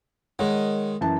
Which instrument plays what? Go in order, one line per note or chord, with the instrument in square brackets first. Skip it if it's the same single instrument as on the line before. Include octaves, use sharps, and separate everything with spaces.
[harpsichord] D#3 G#3 [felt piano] A#4 C#5 F#5
[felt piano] F#2 E3 A5